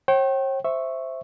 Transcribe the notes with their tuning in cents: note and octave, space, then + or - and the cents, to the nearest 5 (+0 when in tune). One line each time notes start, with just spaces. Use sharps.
C#5 -45 G5 -30
C5 +0 E5 +0 C#6 -5